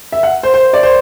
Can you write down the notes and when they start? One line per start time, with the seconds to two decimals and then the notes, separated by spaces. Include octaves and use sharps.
0.12 E5
0.23 F#5
0.43 C5
0.54 C5
0.73 D5
0.83 C5